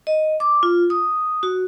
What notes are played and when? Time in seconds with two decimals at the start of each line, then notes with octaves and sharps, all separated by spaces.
0.07 D#5
0.40 D6
0.63 F4
0.90 D#6
1.43 F#4